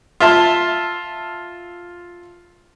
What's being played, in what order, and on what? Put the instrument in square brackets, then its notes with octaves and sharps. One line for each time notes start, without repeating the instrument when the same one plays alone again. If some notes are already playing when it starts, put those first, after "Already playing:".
[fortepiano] F4 E5 A5 C6